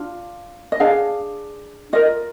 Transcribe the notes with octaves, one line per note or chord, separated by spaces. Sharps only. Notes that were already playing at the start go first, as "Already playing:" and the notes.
Already playing: D4 F4
D#5
D4 G#4 F5
F4 A#4 D#5